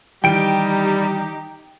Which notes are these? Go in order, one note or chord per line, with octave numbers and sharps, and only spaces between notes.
D#3 E3 G3 D#4 G4 G5 D7